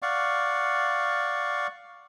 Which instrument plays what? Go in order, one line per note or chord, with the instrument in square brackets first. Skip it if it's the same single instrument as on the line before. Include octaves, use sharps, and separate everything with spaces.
[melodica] D5 F5 F#5 C#6